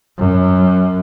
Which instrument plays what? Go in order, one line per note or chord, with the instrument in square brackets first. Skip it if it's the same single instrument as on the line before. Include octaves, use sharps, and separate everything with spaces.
[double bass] F#2